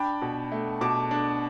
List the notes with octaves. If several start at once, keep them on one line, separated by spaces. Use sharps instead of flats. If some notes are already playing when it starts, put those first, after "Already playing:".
Already playing: D4 G5 B5
B2
A3
B2 A5 D6
D4